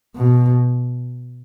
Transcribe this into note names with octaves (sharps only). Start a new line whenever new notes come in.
B2